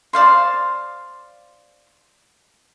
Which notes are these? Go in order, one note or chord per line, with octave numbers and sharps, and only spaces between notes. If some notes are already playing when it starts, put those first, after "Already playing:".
C5 D5 F5 C6